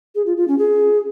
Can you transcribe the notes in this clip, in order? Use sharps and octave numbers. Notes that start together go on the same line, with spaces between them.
G#4
F4
F4
C#4
G#4